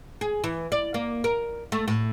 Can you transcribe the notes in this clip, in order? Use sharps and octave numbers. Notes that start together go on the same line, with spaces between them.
G#4
E3
D5
A#3
A#4
A3
A2